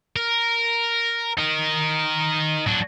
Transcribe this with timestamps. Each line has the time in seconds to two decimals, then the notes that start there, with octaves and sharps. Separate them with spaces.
0.16 A#4
1.38 D#4 A#4
2.67 F#3 D4